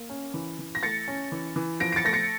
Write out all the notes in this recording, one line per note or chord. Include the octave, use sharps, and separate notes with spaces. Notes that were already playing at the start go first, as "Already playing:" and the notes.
Already playing: A#3
C#4
E3
E3
A#6
A3 A6 C#7
C#4
E3
E3
F3 A#6 D7
D7
A6 C#7
A3 A#6
A6 C#7